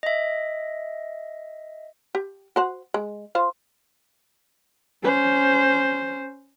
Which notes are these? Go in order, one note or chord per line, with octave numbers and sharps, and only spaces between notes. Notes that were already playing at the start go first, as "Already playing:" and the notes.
D#5 E5
G4
F#4 C5 F#5
G#3
F4 C5 F5
C#4 C5